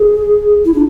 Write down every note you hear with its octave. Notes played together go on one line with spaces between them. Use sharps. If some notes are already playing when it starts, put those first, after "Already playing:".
Already playing: G#4
E4
D4